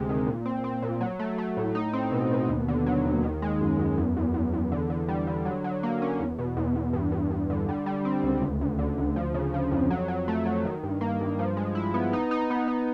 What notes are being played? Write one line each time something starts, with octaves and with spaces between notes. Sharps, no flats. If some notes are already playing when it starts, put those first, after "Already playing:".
Already playing: D2 C3 G#3
D#3
A#2
C4
C4
A#2
F#3
A3
A3
A2
D#4
C4
B2
B2
D#2
D3
F#3
D#2
D#3
G#3
F#2
F#2
E2
E2
E2
E2
D3
D3
G3
D3
F#3
F#3
A#3
C#4
E2
B2
E2
E2
G2
G2
G2
D3
G3
G3
C4
C#2
D2
D2
D3
D2
F3
C#3
F3
F2
F#3
F#3
A3
F#3
D#3
G2
A#3
G2
F3
G#3
E4
B3
D#4
D#4
B3
D#4